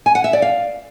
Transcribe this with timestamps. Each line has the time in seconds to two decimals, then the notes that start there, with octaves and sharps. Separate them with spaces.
0.06 G#5
0.15 F#5
0.24 E5
0.33 D5
0.42 F5